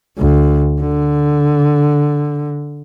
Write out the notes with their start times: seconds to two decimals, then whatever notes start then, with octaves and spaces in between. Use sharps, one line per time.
0.18 D2
0.81 D3